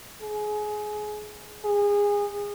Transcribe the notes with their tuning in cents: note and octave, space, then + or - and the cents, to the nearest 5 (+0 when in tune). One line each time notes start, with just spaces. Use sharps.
G#4 +20
G#4 -25